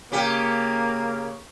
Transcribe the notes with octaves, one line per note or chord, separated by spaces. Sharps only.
C#3 A#3 G4